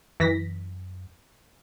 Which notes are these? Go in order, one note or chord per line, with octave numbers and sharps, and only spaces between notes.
F#2 E3 A#6 B6